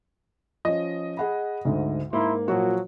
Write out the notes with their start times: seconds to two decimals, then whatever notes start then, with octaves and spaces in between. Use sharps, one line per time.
0.65 F3 C#4 D#5
1.17 G#4 F#5 B5
1.65 D2 G#2 D3
2.13 G#2 A#3 E4 A#4 C6
2.48 A#2 F3 F#3 F#4